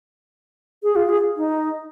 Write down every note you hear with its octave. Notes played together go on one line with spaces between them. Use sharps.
G#4
F4
G#4
D#4